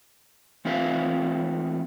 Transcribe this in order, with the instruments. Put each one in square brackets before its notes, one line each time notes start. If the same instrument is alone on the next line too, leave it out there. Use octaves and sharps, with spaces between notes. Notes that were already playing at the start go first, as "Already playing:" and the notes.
[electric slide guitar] E3 A3 C4 F4 E5 F5